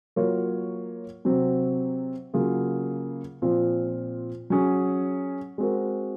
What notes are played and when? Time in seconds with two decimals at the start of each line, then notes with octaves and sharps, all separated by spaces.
0.16 F#3 A#3 F4 A#4 C#5
1.25 C3 F#3 C4
2.34 C#3 F#3 A#3 F4 G#4
3.42 A#2 F3 C4 F4
4.50 F#3 C#4 G#4
5.58 G#3 C4 F#4 A#4